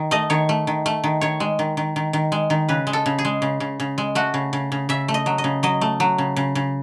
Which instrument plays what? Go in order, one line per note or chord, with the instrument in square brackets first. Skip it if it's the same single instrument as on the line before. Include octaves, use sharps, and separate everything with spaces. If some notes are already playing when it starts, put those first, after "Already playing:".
Already playing: [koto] D#3
A3 D#5
D#3 C#5
A3
D#3
A3
D#3
D#3 C#5
G#3
D#3
D#3
D#3
D#3
G#3
D#3
C#3 B4
G#3
A4
C#3
G#4
G#3
C#3
C#3
C#3
G#3
A3 F#4
C#3
C#3
C#3
C#3 E5
A3
D#5
F#3
D#5
C#3
F#3 D#5
A3
F#3
C#3
C#3
C#3